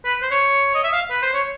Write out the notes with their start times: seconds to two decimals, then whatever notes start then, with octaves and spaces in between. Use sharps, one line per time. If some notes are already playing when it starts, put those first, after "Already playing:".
0.05 B4
0.22 C5
0.31 C#5
0.75 D#5
0.84 E5
0.92 F5
1.10 B4
1.22 C5
1.34 C#5